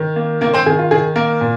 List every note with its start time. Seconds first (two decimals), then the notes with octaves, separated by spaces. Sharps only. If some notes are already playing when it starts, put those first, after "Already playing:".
Already playing: D#3
0.16 A#3
0.41 D#3 A#3 A#4
0.53 C4 C5
0.66 D#3 G#4
0.79 F4
0.91 D#3 G#4
1.16 A#3 A#4
1.41 A#2